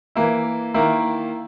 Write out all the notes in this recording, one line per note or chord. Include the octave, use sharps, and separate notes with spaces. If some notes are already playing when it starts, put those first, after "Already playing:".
E3 A#3 E4
D#3 A#3 E4